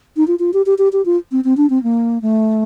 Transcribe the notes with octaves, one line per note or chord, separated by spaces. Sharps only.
D#4
F4
F4
G4
G4
G4
G4
F4
C4
C4
D4
C4
A#3
A3